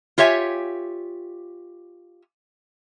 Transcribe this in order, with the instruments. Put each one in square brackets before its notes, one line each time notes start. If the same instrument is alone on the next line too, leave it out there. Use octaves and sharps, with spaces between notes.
[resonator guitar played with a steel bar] F4 G4 C#5 E5 G#5